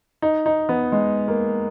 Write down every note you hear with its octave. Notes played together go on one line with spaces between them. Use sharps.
D#4
D#4
B3
G#3
A#3